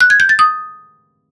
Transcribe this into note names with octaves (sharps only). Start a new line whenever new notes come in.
F#6
G#6
G6
A6
D#6